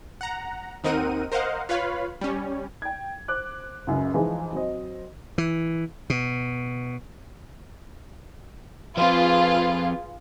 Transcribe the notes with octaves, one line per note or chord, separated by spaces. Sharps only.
F#5 A#5
D#2 C4 D#4 A#4 F#5 D#7
A#4 C5 D#5 F5 F#5
F4 B4 C#5 F5 B5
G3 C#4
G5 G#6
C5 D6 F#6
C#2 F#2 C#3
E3 F3 G#3 D#4
F#3 C4 D#5
E3
B2
F3 C4 F4 G#4 B4